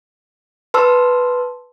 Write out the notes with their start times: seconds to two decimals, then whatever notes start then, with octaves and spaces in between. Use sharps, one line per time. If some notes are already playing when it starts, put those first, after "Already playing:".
0.74 B4 A5 C6 E6 F6